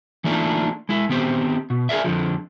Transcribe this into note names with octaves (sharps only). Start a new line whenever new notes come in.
E3 A3 A#3 D4 D#4 F4
G#3 E4
D#3 B3 C4 G4 C5
B2
G#4 A#4 D5 E5
F2 D3 F3